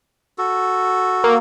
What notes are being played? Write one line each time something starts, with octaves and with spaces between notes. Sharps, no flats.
F#4 A4
A#3